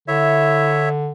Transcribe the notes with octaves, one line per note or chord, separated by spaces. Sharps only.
D3 E4 C#5 E5